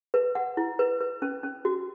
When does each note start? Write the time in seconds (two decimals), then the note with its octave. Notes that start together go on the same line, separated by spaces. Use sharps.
0.14 B4
0.35 F#5
0.57 E4
0.79 B4
1.00 B4
1.22 C#4
1.43 C#4
1.65 F#4